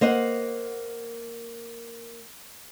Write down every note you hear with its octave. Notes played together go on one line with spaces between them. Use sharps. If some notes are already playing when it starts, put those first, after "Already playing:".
A#3 C5 D#5 F#5